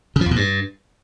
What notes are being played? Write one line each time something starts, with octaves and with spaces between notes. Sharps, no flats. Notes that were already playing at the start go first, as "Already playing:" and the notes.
C#3
F3
F2
B2
G2